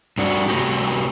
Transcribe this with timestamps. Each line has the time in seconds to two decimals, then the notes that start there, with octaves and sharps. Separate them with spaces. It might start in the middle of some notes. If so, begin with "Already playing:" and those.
0.18 G2 D4 F#4
0.48 C3 A3 F#4 G4